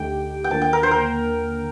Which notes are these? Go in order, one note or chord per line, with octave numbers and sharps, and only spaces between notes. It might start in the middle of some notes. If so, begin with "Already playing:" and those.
Already playing: D2 D3 A3 D#4 G4 G5
G5
D#2 D3 F3 A#3 A5
G5
A#4
C5
A#4